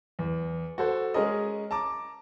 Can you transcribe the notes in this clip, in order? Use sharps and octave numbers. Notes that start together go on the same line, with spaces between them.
E2
F#4 A4 C5
G#3 C#4 G#4 A#4 D#5
A5 A#5 D6